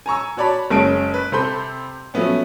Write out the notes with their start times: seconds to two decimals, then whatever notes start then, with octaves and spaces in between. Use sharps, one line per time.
0.06 G#5 A#5 C#6 E6
0.37 F#4 C#5 D5 A5 B5
0.70 F#1 G#3 C#4 A5 D7
1.14 B4
1.32 C3 C4 A4 B5 C6 G6
2.14 F3 F#3 A3 B3 C#4